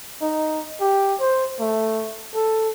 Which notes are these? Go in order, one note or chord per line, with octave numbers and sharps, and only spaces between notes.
D#4
G4
C5
A3
A4